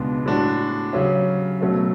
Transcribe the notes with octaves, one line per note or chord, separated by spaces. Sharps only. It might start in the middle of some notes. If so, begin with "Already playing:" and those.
Already playing: C#2 B2 G#3 B3 D4
A2 G#3 D4 F#4
C#3 F#3 C#4
B2 F#3 A3 C#4